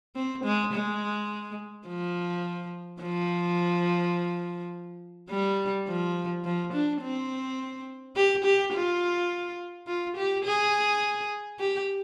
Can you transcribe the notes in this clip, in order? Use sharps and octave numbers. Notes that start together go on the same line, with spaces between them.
C4
G#3
G#3
F3
F3
G3
F3
F3
D4
C4
G4
G4
F4
F4
G4
G#4
G4